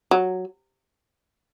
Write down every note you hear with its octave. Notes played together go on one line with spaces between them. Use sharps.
F#3